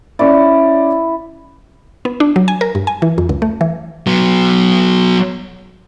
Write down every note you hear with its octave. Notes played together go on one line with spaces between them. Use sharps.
C#4 E4 D5
B3
D4
F#3
G#5
A#4
G2
G#5
E3
F2
C#2
A3
E3
F#3 B3